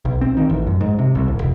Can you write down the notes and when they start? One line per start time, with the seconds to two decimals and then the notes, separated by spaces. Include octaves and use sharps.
0.05 B1
0.21 C4
0.37 D#3
0.50 A1
0.67 F#2
0.81 G#2
0.99 C3
1.15 C2
1.28 D#1
1.41 F1